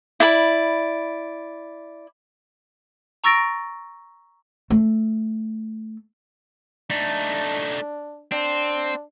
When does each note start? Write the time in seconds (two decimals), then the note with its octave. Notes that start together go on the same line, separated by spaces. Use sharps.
0.20 E4 D5 B5
3.24 A#5 C#6 E6 A6 A#6 D7
4.70 A3
6.90 A3 D4 D#4
8.32 C4 D4